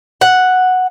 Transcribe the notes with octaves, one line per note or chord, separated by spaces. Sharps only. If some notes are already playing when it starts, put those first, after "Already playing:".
F#5